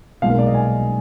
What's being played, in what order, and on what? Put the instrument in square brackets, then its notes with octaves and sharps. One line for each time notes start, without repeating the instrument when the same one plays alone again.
[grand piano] B1 A#2 G#3 F5
A#4
D5
D#5
G#5